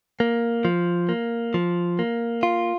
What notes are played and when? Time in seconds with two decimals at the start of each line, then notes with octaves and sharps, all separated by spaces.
0.20 A#3
0.65 F3
1.09 A#3
1.54 F3
1.99 A#3
2.43 F4